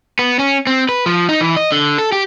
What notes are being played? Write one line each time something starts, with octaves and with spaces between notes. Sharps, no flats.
B3
C#4
C4
B4
F3
D#4
E3
D#5
D3
A4
G4